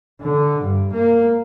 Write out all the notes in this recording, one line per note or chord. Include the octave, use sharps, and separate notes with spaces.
D3
G2
A#3